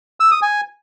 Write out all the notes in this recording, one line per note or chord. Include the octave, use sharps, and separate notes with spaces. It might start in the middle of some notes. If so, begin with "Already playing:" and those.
E6
D#6
G#5